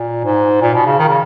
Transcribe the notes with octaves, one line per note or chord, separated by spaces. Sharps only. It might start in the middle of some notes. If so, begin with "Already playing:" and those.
Already playing: A#2
G#2
A#2
B2
C#3
D#3
C#3